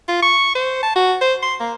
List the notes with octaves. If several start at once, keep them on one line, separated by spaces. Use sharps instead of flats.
F4
C#6
C5
A5
F#4
C5
C6
A#3